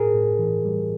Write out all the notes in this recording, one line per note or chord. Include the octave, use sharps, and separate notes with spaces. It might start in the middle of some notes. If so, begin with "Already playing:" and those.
Already playing: A2 G#4 A#4
A2
E3
G3